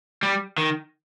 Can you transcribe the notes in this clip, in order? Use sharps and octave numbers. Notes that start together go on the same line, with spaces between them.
G3
D#3